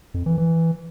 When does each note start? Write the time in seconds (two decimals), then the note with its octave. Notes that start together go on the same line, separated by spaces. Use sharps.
0.14 F2
0.26 E3
0.38 E3